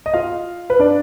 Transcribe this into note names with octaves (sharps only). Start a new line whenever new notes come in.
D#5
F4 F5
B4
D4 D5